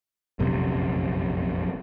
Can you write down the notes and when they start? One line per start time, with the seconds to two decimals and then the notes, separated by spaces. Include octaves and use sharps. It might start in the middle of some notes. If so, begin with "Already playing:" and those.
0.39 F1 A#1 F#2 C3